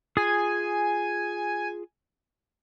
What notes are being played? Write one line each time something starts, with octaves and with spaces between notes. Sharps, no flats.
F4 G#4 G#5 D#6